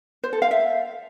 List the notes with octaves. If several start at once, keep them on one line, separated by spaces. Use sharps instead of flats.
C5
A4
F5
E5